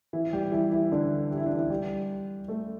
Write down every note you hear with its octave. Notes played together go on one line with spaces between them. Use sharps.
E3 E4
G3 G4
E3 E4
E3 E4
D3 D4
G4
E4
D4
E3 E4
G3 G4
A3 A4